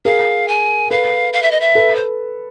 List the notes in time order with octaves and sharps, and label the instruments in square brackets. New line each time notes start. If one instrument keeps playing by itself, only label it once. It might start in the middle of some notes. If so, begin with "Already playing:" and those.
[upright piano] G#4 A#4 [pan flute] F5
[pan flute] G#5
[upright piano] A4 B4 [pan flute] F5
[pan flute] F5
E5
D#5
E5
[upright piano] A4 B4
[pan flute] C5